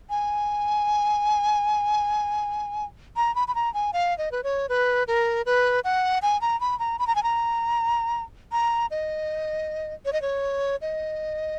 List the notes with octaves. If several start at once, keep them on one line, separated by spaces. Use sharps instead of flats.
G#5
A#5
B5
B5
A#5
G#5
F5
D#5
B4
C#5
B4
A#4
B4
F#5
G#5
A#5
B5
A#5
B5
A#5
G#5
A#5
A#5
D#5
C#5
D#5
C#5
D#5